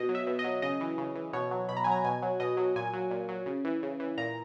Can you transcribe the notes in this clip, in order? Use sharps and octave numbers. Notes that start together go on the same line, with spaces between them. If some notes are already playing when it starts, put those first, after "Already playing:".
Already playing: B2 D#5
F#3
E5
B2
D#5
F#3
C#3 D#5
E3
C#3
E3
B2 C#5
F#3
B2 B5
A#5
F#3 G#5
A#5
B2 G#5
F#3
B2 D#5
F#3
A#2 G#5
F#3
A#2
F#3
C#3
E3
C#3
E3
A#2 A#5